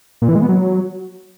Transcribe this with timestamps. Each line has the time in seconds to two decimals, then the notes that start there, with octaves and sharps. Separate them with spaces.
0.22 A#2
0.29 E3
0.35 G#3
0.42 B3
0.49 F#3